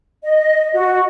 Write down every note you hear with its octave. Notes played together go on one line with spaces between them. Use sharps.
D#5
F#4